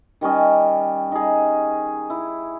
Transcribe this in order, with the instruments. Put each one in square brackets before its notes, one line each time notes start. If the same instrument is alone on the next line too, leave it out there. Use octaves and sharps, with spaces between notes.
[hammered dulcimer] D#3 G3 C#4 D#5
D#4 G#4
E4